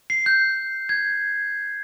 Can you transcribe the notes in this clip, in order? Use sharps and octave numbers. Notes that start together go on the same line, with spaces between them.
C7
G6
G#6